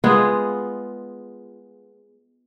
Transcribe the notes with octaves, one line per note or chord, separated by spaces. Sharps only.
G#3 B3 F4 G#4